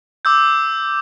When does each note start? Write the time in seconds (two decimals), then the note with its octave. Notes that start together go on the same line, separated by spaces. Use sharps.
0.25 D6 E6 G6